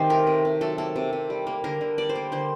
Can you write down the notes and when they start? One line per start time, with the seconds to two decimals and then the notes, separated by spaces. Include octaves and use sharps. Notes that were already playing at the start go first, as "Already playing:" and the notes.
Already playing: C3 D#3 G4 C5
0.10 A3 A#4
0.27 C3
0.45 C3
0.61 F#3 A4
0.78 A#3 A4
0.96 C3
1.13 C3
1.30 G3
1.47 A#3
1.64 D3 A#4
1.81 D3
1.98 G3 D5
2.09 C5
2.15 A#3
2.32 D3 C5